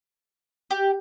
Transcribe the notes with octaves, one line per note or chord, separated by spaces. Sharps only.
G4